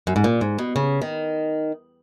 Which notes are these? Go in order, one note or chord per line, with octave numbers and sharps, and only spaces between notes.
F#2
G#2
A#2
G#2
B2
C#3
D#3